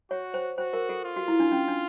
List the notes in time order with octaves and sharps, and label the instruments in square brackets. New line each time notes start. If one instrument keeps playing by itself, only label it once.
[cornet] F#4 [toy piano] C#5
[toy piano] C5
[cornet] F#4 [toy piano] C5
[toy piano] A#4
A4
[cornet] F4
[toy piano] F#4
E4
D4
C#4
D4